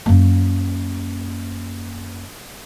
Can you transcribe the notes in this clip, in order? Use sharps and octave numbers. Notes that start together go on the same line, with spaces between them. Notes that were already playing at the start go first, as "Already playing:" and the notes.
F#2 A#3